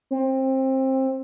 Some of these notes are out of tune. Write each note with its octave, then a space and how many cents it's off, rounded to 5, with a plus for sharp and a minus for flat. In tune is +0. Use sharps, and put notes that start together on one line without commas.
C4 +20